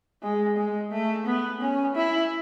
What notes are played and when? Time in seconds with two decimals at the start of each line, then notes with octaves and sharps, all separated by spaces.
0.22 G#3
0.57 G#3
0.91 A3
1.26 B3
1.61 C#4
1.95 E4